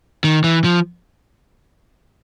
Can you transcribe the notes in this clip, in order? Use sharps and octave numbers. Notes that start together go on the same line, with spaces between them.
D#3
E3
F3